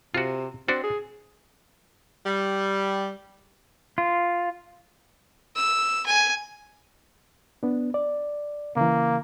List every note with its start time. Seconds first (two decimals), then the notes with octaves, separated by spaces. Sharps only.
0.14 C3 F4 F#4
0.68 C4 D4 F#4
0.83 G#4
2.26 G3
3.98 F4
5.56 E6
6.06 G#5
7.63 B3 D4
7.94 D5
8.77 C#3 E3 A#3